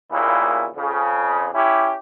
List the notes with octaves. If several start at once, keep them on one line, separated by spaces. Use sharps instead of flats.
D#2 A#2 C#3 B3 E4
F2 C#3
C#4 E4 G4